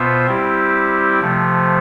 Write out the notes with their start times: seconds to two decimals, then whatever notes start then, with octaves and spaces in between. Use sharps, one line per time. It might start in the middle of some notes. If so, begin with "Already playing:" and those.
Already playing: B2 B3 F4 C5 E5
0.27 G3 C4 E4 G4
1.20 C3 F3 A3